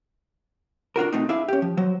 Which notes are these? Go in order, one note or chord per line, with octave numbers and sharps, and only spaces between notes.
D4 F4 F#4 A#4
B2 A3 C4 D#4
D4 E4 G#4 E5 F5
C#4 G4
F3
F#3 C5